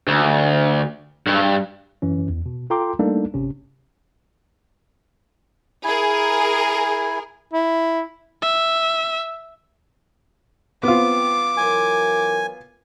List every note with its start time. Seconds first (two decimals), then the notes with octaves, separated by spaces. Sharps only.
0.08 D2
1.27 G2
2.02 F#2 E3 C#4
2.29 E2
2.46 B2
2.70 F4 A4 G5 A#5 C6 D6
2.99 G3 A3 A#3 D4 D#4 A4
3.34 G1 C3 C#4
5.84 E4 G#4 A#4 G#5
7.53 E4
8.42 E5
10.83 B3 C4 F4 D6
11.57 E3 F#3 A#4 G#5